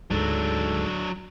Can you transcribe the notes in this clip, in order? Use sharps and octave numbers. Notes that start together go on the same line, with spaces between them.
D2 G#2 F#3 D4 A4